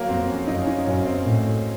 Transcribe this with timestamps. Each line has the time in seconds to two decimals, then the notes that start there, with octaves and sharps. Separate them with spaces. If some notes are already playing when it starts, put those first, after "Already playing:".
Already playing: F#3 A#3
0.09 F2 C4
0.28 C#4
0.47 F#2 D#4
0.62 C#4
0.67 D#4
0.87 F#2 C#4
1.06 C4
1.25 A2